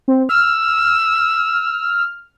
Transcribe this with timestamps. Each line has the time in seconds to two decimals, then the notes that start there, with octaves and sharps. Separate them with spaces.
0.08 C4
0.29 E6 F6